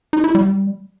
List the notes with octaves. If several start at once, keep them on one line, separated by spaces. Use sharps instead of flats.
D#4
E4
G3